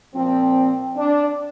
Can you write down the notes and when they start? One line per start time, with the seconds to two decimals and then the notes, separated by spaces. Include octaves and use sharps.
0.13 A#2 F3 C4
0.97 D4